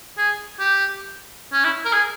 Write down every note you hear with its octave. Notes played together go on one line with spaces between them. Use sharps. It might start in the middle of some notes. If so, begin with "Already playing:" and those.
G#4
G4
C#4
E4
A#4
G#4